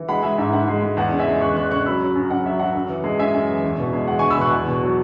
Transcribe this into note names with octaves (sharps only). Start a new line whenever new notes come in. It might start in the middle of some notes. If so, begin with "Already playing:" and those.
Already playing: E3
G#3 F#5 B5
G#3 E5 G#5
G#2 E5
G#2 F#5
G#3
G#3
E2 F#5
C#3
E5 G#5
G#3
E2 C#6 F#6
E2 C#6 F#6
C#3 C#6 F#6
F#3 B5 E6
F#3
F#2
F#2 F#5
F#3 E5
F#3 F#5
F#2
E3
G#3
F#2 E5 G#5
F#2
E3
E2
B2
G#3
E2 F#5
E2 G#5 C#6
B5 E6
B2 C#6 F#6
E2
B2
F#3